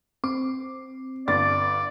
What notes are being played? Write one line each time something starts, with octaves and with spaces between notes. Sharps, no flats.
C4 D6
G1 D4 D5 A6